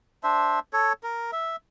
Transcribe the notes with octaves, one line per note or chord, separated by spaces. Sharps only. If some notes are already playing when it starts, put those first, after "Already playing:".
D4 C5 E5
A4 C#5
A#4
E5